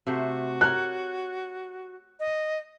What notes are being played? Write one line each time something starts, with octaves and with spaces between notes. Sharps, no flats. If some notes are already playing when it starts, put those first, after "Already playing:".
C3 A3 F#4 C5
G4 A#4 C#5 F#6
D#5